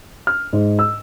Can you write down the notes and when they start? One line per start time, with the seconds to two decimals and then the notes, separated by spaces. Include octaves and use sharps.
0.27 F6
0.53 G#2
0.79 E6